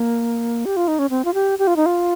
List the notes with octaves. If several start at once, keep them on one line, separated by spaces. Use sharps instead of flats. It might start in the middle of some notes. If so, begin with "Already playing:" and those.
Already playing: A#3
G4
F4
D#4
C#4
C4
F4
G4
G4
F4
D#4
F4